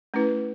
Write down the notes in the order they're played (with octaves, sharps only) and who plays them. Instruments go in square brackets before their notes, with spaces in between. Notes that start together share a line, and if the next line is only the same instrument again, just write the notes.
[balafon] A3 C#4 E4 B4